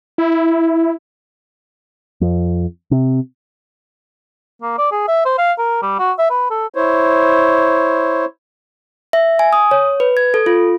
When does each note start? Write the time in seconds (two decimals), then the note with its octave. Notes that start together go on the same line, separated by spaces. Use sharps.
0.18 E4
2.21 F2
2.91 C3
4.62 A#3
4.78 D5
4.91 G#4
5.08 E5
5.25 C5
5.38 F5
5.58 A#4
5.82 G3
5.99 F#4
6.18 E5
6.30 B4
6.50 A4
6.75 E4 C5 C#5
9.13 E5
9.39 G#5
9.53 D#6
9.71 C#5
10.00 B4
10.17 G#6
10.34 A4
10.46 F4